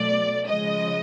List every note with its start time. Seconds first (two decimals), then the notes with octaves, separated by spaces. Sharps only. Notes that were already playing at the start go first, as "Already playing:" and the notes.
Already playing: B2 F#3 A3 D5
0.47 C#3 F3 G#3 D#5